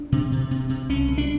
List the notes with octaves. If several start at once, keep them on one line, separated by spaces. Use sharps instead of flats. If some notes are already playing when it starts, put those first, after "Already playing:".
Already playing: D4
C3
C3
C3
C3
C2 C#4
C2
D4